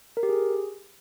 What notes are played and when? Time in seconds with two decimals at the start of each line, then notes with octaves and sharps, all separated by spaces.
0.17 A#4
0.23 G4
0.29 G#4